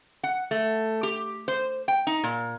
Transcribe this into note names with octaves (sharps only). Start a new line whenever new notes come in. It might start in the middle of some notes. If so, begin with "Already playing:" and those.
F#5
A3
G4
C5
G5
D#4
A#2